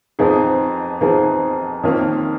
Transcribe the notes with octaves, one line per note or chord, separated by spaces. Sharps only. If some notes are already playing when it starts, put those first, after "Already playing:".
F2 F3 B3 D#4 G#4
F2 F3 B3 D#4 G#4
F2 D#3 A#3 C#4 F4